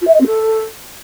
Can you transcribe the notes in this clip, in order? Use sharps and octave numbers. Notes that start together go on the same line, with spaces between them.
F4
E5
D#5
C4
A4